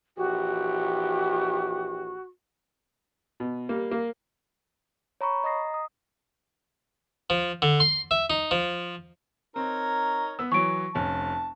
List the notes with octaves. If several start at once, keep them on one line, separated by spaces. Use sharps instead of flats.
A#1 E3 F#4 G4
B2
G3 A#3
A#3
C#5 A#5 B5 C#6
D#5 A#5 D#6 A#6 C7
D#6
F3
D3
C6
E5
D#4
F3
C4 D#4 A#4 C#5
B3 E6
E3 F#3 C#6 D7
F1 C#4 A5